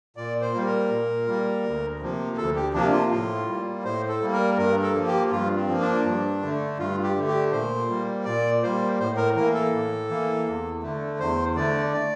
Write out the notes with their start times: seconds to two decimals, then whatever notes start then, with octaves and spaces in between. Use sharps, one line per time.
0.17 A#2 D5
0.41 C5
0.54 G3 A#3
0.66 A#4
0.90 A#2
1.27 G3 A#3
1.64 D2
2.00 C3 F3 A#3
2.37 D2 A4
2.56 G4
2.73 C3 F3 A#3 D4
2.92 F4
3.10 A2 F4
3.47 G3 A#3
3.84 A2 C5
4.09 A4
4.21 G3 A#3
4.33 A#4
4.58 G2 A#4
4.82 A4
4.94 F3 A#3
5.07 G4
5.31 G2 F4
5.56 C4
5.68 F3 A#3
5.81 D4
6.05 G2
6.41 D3 A3
6.78 G2 F4
7.03 G4
7.15 D3 A3
7.27 G4
7.52 A#2 C5
7.88 G3 A#3
8.25 A#2 D5
8.62 G3 A#3 C5
8.99 A2 C5
9.17 A#4
9.35 E3 A#3 A#4
9.54 A4
9.72 A2
10.09 E3 A#3
10.46 E2
10.82 D3 A3
11.19 E2 C5
11.56 D3 A3 D5
11.93 D5